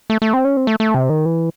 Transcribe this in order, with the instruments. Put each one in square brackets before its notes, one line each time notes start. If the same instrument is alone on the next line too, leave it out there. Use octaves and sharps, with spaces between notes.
[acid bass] A3
A3
C4
C#4
C4
A3
A3
C3
D#3
E3